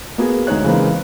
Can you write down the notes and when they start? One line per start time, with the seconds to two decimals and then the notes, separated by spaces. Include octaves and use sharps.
0.18 A#3 B3 F#4 G#4
0.47 D2 G#3 D#4 C#5 F#6
0.64 C#3 E3 G#3 A#3 C4 D#4